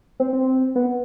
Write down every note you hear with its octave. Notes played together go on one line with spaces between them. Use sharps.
C4
C4
B3